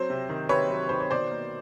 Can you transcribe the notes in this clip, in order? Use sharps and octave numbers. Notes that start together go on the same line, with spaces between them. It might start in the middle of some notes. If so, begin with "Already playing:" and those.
Already playing: F#3 C4 C5
C3
D#3
C3 B4 C#5
F#3
D#3 C5
C#5
B2 C5 D5
A#3